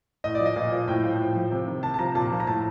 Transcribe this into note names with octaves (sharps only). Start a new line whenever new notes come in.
A2 D#5
D5
F3
D#5
A#2
F3
A2 G5
F3
A2
F3
C3
D#3
C3 A5
A5
F3 A#5
A#2 A5
F3
A#5
A2 A5